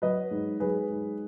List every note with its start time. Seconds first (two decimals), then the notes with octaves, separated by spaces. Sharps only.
0.02 F#3 B4 D#5
0.31 G#2
0.60 F#3 G#4 B4
0.90 G#2